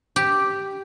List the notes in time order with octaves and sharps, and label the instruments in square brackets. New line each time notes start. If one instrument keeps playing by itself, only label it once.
[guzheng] G4